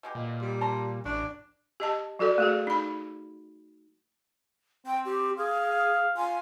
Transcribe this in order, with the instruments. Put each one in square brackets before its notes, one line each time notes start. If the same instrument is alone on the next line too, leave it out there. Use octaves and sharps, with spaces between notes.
[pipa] B2 G#3 G4
[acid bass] A#2
[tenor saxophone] G3
[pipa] A5 A#5 C6
[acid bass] A1 [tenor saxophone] D4 [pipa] C#6
[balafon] G4 D#5 A5
F#3 F#4 A4 D5
A3 F#4 G#4
D#4 B5
[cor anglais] C4 [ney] G5
[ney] G4
[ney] G#4 [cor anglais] F5
[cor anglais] F5
[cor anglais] F4 [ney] G#5